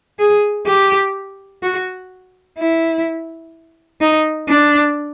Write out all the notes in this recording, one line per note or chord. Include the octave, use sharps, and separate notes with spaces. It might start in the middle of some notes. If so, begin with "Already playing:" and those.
G#4
G4
F#4
E4
D#4
D4